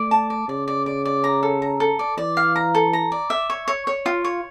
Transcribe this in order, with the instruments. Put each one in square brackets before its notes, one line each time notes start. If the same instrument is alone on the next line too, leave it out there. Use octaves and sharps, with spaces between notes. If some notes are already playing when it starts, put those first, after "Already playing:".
Already playing: [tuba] A3 [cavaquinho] D5
[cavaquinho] A5
D5
[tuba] C#3 [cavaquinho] D5
[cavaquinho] D5
D5
D5
A#5
A4
A#5
A4
D5
[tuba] E3 [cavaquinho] D5
[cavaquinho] F5
A#5
A4
A#5
D5
E5
C#5
C#5
C#5
F4
C#5